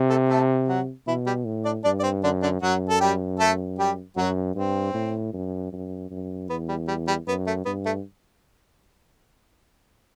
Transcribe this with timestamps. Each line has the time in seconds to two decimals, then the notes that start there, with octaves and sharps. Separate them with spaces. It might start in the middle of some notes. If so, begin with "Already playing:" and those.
Already playing: C3
0.10 A3 A4
0.29 A3 A4
0.68 F#3 F#4
1.07 B2 E3 E4
1.26 G3 G4
1.45 A2
1.65 D4 D5
1.84 G2 D4 D5
2.00 D5
2.03 C4 C5
2.23 F#2 D3 D4
2.42 D3 D4
2.62 F#2 F#3 F#4
2.89 A4
3.00 G3 G4
3.39 A3 A4
3.79 G3 G4
4.16 F#2 F#3 F#4
4.55 G2 C4
4.94 A2
5.33 F#2
5.72 F#2
6.11 F#2
6.49 E2 B3
6.69 G3
6.88 G3
7.08 G3
7.27 F#2 B3
7.47 A3
7.65 G2 B3
7.85 A3